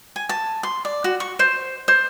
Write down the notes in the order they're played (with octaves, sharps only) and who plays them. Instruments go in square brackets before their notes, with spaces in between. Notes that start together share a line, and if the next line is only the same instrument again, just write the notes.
[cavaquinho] G#5
A5
C6
D5
F#4
C#6
C5
C5